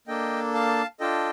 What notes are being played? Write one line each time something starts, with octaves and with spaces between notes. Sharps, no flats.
A#3 D4 A4 D#5 G5
F5 A5
D4 F4 A4 D#5 G5